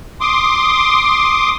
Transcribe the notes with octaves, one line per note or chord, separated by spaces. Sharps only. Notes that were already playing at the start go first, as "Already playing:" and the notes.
C6 D6 D#6